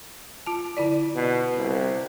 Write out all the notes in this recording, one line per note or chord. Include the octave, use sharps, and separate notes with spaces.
F4 A5
D3 E4 D5
B2
C2